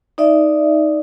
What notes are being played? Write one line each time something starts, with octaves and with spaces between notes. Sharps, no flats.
D#4 D5 E5